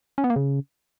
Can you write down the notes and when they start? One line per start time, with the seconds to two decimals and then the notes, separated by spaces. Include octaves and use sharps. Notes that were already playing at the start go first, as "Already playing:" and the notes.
0.18 C#4
0.24 B3
0.30 A#3
0.36 C#3